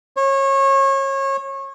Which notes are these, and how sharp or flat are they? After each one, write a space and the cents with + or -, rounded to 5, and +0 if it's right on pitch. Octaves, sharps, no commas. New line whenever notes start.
C#5 -30